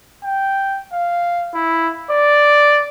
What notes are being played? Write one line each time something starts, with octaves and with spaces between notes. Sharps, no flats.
G5
F5
E4
D5